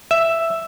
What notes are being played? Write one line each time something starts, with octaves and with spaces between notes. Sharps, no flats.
E5